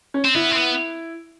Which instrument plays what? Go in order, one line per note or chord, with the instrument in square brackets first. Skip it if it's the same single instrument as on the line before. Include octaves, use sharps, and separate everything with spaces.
[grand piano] C#4
[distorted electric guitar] C4
[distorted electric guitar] B3 [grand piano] E4
[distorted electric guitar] C4
B3